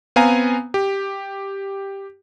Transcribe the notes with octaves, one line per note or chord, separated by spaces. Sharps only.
B3 C4 F5 G#5 A#5
G4